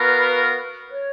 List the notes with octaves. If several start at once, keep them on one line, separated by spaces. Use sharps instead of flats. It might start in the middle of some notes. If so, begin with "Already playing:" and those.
Already playing: B3 F#4 A#4 B4 F5
C#5